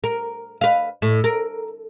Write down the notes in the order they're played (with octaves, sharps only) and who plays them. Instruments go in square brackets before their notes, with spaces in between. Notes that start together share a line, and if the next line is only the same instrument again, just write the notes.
[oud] A#4
B4 F5
A2
A#4